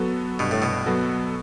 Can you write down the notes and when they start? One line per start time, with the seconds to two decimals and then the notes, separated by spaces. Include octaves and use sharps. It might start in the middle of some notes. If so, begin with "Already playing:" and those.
Already playing: F#3 B3 F#4 A4
0.39 G2 B2
0.51 A2
0.62 B2
0.86 F#3 B3 F#4 A4